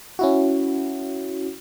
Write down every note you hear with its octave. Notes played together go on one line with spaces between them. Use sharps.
C#4 E4 F#4